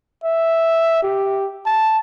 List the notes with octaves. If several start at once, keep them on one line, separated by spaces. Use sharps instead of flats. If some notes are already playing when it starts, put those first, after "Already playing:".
E5
G4
A5